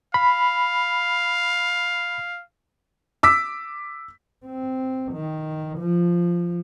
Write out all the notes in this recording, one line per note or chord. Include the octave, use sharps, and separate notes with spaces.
F5 B5
D6 E6 B6
C4
D#3
F3